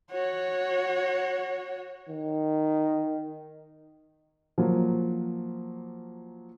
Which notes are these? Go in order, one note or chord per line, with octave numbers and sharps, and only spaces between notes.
F#4 C#5
D#3
F3 F#3 A#3